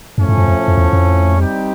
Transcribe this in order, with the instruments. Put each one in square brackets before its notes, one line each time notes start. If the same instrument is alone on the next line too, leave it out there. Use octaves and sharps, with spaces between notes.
[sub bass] F#2 [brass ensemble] A2 F3 A3 C#4
[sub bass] G2
F#2
F2
F2
E2
F2
[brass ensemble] G3 C4 D#4 G4